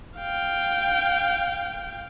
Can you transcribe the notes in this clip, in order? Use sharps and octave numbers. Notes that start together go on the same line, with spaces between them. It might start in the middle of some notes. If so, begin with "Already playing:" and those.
F5 G5